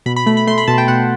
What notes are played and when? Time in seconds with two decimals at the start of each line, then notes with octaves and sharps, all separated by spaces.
0.06 B2 B5
0.16 B5
0.26 A3 B5
0.37 B5
0.47 A3 C6
0.58 B5
0.68 B2 A5
0.78 G5
0.88 B2 F#5